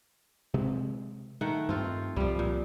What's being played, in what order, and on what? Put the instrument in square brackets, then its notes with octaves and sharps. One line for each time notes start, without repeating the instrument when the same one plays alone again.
[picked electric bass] C3 G#3 C4
[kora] D#3 A3 F#5
[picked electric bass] G2 [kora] C4 F4
[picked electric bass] C2 [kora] F3 G3
[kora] A#2